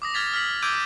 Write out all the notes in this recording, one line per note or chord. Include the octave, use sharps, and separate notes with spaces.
D6 D#6 A#6
F6 G#6 A6 B6 F7
F6 A#6 B6 F#7
D6 E6 G6 G#6 D7 D#7